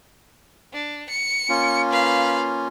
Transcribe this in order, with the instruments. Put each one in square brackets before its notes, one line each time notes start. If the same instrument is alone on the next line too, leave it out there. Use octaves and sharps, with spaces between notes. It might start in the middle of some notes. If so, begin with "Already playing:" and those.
[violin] D4
C#7
[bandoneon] A#3 C#4 F4
[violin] B4 F5